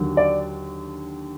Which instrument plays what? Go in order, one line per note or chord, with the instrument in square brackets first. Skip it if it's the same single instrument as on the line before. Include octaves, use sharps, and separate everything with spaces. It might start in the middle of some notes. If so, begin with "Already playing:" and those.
Already playing: [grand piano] D#2 D3 F#3
D5